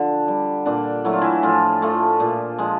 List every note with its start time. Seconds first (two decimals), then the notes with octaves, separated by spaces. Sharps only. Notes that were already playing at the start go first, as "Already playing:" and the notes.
Already playing: D3 F3 D4
0.28 G3
0.66 A#2 D4
1.05 F#3 A3 E4
1.13 F4
1.22 E3 E4
1.43 A2 F3 F4
1.82 F3 A3
2.20 A#2
2.58 F3 G#3